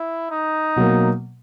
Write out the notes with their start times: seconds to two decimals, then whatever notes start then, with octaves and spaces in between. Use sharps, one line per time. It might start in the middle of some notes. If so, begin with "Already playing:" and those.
Already playing: E4
0.31 D#4
0.76 B2 F#3 A#3